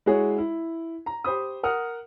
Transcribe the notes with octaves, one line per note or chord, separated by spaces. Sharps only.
G#3 E4 F#4 G#4 C#5
E4
A#5
G4 C5 B5 D#6
A#4 F#5 D#6 F6